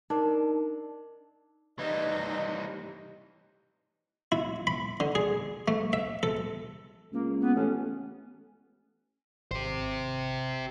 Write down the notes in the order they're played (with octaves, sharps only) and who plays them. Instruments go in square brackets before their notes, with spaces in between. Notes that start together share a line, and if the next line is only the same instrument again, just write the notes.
[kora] D4 [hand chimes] D#4 A#4
[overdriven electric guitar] E3 G3 [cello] D#4 [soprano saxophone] D#5
[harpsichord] E4
B5
D3
G#4
A3
E5
A4
[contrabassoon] C#2 [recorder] A#3
[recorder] B3
[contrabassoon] A1 [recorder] C#4
[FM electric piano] G#1 [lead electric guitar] G4 C5